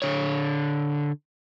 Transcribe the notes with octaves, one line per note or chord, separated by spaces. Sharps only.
D3 C#5